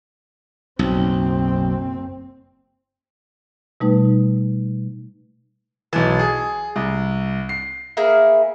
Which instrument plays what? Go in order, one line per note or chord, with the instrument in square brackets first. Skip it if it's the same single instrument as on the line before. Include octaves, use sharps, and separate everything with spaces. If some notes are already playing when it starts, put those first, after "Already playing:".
[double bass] F#1 C4 [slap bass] B1
[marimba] B2 G3 A3 D#4 B4
[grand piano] B1 E3 [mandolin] A5
[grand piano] G#4
C2
C7
[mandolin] A#3 E4 G#4